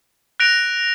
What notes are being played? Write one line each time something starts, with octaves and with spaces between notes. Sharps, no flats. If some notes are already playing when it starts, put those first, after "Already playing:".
F#6 A#6 D7 F7